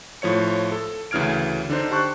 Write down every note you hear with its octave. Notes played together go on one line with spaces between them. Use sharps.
A2 F3 C#5 C#7
A4
D2 C#3 E3 F6 G#6 D7
D3 D4 D#4 C5
G4 C5 A5 C#6 F#6